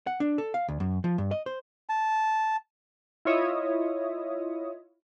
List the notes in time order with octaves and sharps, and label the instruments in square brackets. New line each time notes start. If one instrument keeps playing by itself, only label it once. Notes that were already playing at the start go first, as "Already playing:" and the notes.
[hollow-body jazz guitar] F#5
D4
A4
F5
D2
F#2
F3
G2
D#5
C5
[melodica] A5
[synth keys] E4 F4 C#5 D#5 E5 D#6